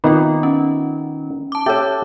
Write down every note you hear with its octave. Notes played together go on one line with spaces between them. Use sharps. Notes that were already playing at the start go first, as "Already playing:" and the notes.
D#3 B3 C4 D#4 F4 B4
C#4
A5 D6
G4 A4 C#5 E5 G5